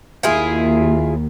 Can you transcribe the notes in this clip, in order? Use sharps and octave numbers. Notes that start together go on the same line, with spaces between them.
D#2 E4 F4 G#4